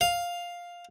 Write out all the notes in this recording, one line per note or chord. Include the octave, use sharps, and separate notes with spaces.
F5